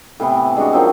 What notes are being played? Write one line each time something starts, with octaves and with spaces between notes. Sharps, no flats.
A2 C3 E3 B3
G#3 D4 F#4
D#3 F3 F#3 C4